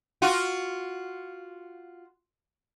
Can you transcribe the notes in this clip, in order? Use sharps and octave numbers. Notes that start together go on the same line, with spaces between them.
F4 F#4